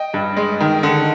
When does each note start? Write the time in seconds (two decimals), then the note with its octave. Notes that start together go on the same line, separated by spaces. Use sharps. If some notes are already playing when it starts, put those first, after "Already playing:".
Already playing: D#5 G5
0.14 G2
0.37 G#3
0.60 D#3
0.83 D3